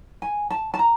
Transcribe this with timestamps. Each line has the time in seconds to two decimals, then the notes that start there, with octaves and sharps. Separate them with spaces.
0.22 G#5
0.50 A5
0.74 A5
0.79 A#5